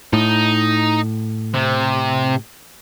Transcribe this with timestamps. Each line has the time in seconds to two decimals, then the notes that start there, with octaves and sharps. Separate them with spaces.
0.13 A2 D#4
1.54 C3